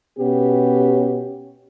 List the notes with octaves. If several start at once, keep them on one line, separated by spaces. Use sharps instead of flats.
B2 B3 C#4 G4